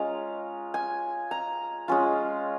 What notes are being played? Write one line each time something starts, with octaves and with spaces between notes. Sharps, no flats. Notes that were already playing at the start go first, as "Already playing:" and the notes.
Already playing: G#3 C#4 F4 A#5
G#5
A#5
G#3 C#4 F4